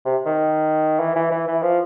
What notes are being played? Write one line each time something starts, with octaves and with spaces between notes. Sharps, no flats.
C3
D#3
E3
E3
E3
E3
F3